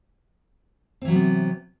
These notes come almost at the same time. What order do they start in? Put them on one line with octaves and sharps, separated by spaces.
C4 E3 F#3 C3 B3